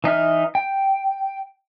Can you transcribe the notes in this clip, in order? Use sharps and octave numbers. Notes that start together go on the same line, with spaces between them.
E3 D#4 E5 F6
G5